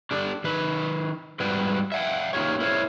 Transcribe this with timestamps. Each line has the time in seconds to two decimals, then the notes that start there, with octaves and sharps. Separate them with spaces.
0.11 D4 G4 A4 D5
0.44 D#3 B4
1.40 G#2 G3 F#4 B4 G5
1.92 E5 F#5 G5
2.33 A#3 D#4 F4 G4 C#5
2.60 E4 A#4 C5 C#5